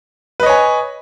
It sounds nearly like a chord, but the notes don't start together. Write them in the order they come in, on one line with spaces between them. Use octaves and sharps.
B4 D#5 C#5 G#5